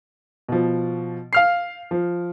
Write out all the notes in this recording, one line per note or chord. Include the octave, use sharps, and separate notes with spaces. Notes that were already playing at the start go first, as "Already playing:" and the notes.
B2 F3
F5 F6 C7
F3